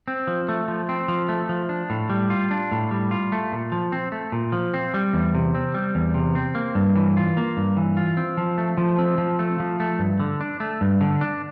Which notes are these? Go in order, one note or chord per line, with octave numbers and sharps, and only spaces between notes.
C4
F3
A3
F3
C4
F3
A3
F3
D4
A2
G3
F4
D4
A2
G3
F4
A3
A#2
F3
C4
A3
A#2
F3
C4
G3
E2
C3
C4
G3
E2
C3
C4
A#3
G2
E3
F4
A#3
G2
E3
F4
C4
F3
A3
F3
C4
F3
A3
F3
A3
G2
D3
D4
A3
G2
D3
D4